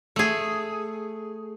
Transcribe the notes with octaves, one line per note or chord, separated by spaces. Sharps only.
A3 G#4